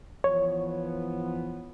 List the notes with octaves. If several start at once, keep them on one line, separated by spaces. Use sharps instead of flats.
E3 F3 B3 C#5